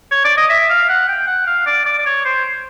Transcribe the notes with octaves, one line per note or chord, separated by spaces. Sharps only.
C#5
D5
D#5
E5
F5
F#5
G5
F#5
F5
D5
D5
D5
C#5
C5